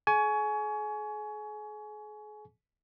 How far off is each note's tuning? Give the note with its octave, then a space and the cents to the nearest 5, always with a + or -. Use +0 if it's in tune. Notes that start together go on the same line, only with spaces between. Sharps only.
G#4 +40 G#5 +25 C#6 +25